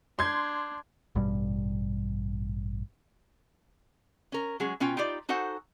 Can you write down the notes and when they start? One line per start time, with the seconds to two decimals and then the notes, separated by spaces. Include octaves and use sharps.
0.19 D4 C6 G6 G#6
1.15 A1 G2 B2 G3
4.32 C#4 A#4
4.60 F#3 G#3 C#4 G#4
4.80 B2 C#4 F4 G5
4.97 D#4 F4 G4 D5
5.29 D#4 F#4 A4 C5 F#5 G#5